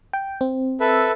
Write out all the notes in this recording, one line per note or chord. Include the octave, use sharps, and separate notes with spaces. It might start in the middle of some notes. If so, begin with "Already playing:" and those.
G5
C4
A4 B4 E5